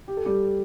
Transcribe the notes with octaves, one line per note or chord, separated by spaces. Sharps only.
G4
A4
G3 G4